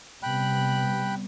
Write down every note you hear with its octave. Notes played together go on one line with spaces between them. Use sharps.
C3 G3 B3 G5 B5 F#6